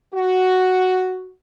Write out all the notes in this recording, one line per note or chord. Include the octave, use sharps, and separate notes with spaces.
F#4